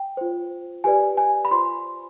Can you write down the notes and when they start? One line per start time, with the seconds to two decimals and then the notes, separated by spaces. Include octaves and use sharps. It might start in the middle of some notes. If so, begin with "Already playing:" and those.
Already playing: G5
0.17 F4 C5
0.84 G4 B4 D5 G#5
1.17 G#5
1.45 B5
1.51 F4 C5 C6